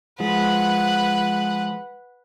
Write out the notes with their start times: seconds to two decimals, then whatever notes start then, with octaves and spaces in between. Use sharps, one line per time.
0.20 F3 G#3 B4 F#5